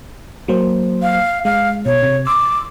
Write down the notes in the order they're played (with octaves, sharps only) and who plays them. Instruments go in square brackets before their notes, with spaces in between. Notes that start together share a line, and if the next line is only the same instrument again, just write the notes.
[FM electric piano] F#3 A#3 C5
[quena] F5
[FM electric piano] G#3 [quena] F5
[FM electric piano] B2 [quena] C#5
[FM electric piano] C3
[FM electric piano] C6 E6 [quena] D6